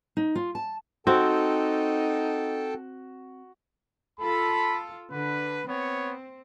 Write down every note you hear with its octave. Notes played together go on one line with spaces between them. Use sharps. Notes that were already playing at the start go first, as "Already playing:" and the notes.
D#4
F4
A5
C4 D#4 F#4 A4 G5 A5
F4 A4 B5
D3 B4
B3 C4 C#5